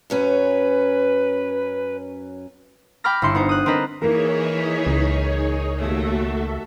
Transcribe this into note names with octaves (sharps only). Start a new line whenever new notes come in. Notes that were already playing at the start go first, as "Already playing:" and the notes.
F#2 F#3 C#4 B4
G5 B5 D6 F6 A#6
G1 E4 C6 C#7
B3 D#4 C5
D#6 F#6
C4 D4 A#4 B4 D#5
E3 A#3 D#4 G#4 A#4 C#5
C#2
D#2 A3 F#4 A4 E5